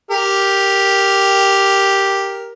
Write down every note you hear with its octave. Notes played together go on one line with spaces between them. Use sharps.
G4 A#4